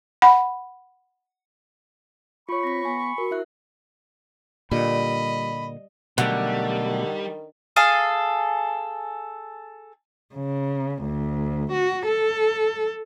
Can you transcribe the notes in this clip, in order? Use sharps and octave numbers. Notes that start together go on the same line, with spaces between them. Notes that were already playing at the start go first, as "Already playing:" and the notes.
F#5 B5
F4 C#5 B5 C#6
C4 A#6 B6
B3 G#5
F#4 A#4
E4 E5 F#6
A#2 D3 G3 D#5 B5
B2 D3 D#3 F#3 G3 A3
G#4 A4 F5
C#3
D2
F#4
A4